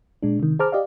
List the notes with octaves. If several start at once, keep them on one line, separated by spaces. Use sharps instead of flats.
A#2 G#3 D4
C3 D#3
G#4 C5 A5 A#5 D6 F6
G4 D5 D#5 F5